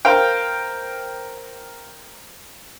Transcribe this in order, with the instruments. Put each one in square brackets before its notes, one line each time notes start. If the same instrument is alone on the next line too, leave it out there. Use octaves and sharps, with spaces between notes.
[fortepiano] A#4 C5 F5 G5